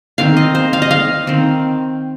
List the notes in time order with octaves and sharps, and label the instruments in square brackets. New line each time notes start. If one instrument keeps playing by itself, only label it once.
[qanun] D#3 C4 F5
D#5
C5
F5
D#5
F5
D#3 C4